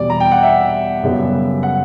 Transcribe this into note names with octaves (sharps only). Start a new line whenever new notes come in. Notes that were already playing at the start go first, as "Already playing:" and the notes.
Already playing: E2 B2 G3 D5
A#5
G5
F#5
E5
F#2 C#3 G3 B3
F#5